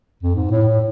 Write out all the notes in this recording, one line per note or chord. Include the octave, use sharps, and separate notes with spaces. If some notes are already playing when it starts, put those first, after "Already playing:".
F2
G#2
A2
A2